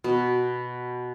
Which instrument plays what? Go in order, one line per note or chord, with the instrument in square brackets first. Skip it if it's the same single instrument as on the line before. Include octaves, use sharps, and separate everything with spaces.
[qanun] B2